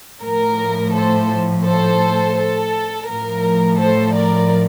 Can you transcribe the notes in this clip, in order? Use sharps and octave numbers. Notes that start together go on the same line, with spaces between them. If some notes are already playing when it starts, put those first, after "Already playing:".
A2 F3 A#4
A4 C5
A4 C5
A4
A2 F3 A#4
A4 C5
A#4 D5